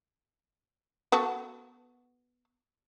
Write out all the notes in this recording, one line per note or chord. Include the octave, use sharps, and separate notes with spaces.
B3 F#4 A4